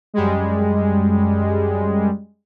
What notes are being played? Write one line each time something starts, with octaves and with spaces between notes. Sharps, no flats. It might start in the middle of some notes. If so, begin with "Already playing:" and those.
F#2 G3 G#3